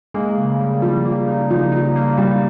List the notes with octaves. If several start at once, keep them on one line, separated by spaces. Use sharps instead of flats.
G#3 A#3
C#3
G3
F3 G3
A#3
D#4
F3 D#4
D#4
A#3
G3 D#4